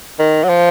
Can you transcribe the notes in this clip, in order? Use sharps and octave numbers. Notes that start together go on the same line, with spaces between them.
D#3
F#3
F3